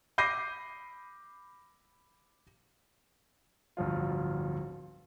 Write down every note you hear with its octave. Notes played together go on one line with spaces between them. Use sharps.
B5 D6 G6 A#6 C7 D#7
D1 G1 F3 F4